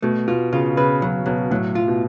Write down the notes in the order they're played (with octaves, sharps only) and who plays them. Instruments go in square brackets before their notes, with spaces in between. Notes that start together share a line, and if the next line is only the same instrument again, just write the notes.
[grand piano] B2 [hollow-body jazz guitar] A3
[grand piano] B2 [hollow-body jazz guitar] F4
[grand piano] C#3 [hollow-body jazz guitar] F4
[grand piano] C#3 [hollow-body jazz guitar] B4
[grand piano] C#3 [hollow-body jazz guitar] F#3
[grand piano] B2 [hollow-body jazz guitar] F#3
[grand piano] A2 [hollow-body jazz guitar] F#3
[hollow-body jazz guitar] F4
[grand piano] B2